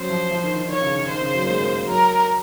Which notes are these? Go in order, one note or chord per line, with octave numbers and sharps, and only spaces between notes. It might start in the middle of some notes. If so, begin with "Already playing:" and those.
Already playing: F#3 C#4 C5
F3
F3
D#3
D#3
D#3 C#5
C#3
D#3
D#3 C5
C#3
F#3
A#3
G#3
A#3
A#3
F#3 A#4